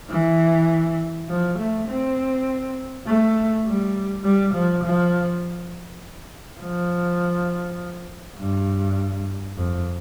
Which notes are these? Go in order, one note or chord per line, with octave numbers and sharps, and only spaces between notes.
E3
F3
A3
C4
A3
G3
G3
F3
F3
F3
G2
F2